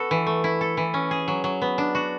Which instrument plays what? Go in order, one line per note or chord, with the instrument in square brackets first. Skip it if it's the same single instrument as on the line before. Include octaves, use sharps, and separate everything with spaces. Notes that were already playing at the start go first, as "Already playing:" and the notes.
Already playing: [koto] B3 F#4 A4
E3
A3
E4
A4
E3
C#4
G#4
F#3
F#3
B3
D4
F#4